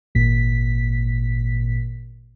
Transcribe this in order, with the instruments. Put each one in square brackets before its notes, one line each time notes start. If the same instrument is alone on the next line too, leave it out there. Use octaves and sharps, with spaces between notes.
[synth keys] G#1 A#2 B6